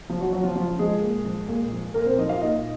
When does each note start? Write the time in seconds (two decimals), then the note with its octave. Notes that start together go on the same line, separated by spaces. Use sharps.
0.09 C#3 F3 F4
0.21 F#3 F#4
0.33 F3 F#3 F#4
0.43 F3 F4
0.55 C#3 F3 F4
0.79 F3 G#3 G#4
1.01 A#2
1.25 F3
1.48 A#2
1.72 F3
1.94 A#2 A#3 A#4
2.06 C4 C5
2.17 F3 D#4 D#5
2.29 F4 F5
2.40 A#2 D#4 D#5